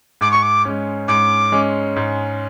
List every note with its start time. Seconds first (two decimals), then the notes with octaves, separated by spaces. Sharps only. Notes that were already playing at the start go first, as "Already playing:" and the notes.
0.21 G#2 D6
0.31 C#6
0.42 D6
0.65 G#3 C#4
1.08 G#2 D6
1.52 G#3 C#4
1.96 G#2